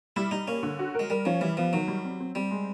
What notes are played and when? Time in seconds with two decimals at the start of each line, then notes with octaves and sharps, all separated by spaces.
0.16 G3 E4
0.31 G3 D#4
0.48 A#3 C#4
0.63 D3
0.79 F#4
0.95 G#3 A#4
1.10 G3 A#4
1.25 F3 C#4
1.41 E3 G3
1.57 F3 B3
1.73 D#3 F#3
1.88 G3
2.04 C4
2.20 C4
2.35 G3 C4
2.51 G#3